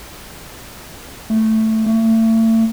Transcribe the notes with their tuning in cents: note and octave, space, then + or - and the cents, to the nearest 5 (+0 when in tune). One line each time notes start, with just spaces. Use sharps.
A3 +5
A3 +35